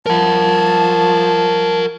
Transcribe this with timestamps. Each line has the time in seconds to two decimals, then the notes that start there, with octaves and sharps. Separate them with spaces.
0.06 F3 A#4 F#5 A5